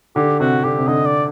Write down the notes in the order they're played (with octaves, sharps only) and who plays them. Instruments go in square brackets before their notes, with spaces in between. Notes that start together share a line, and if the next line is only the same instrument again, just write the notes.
[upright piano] D3 [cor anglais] G4
[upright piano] C3 [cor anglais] F#4
[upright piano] D3 [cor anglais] G4
[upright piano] C3
[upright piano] D3 [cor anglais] D#5
[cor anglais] D5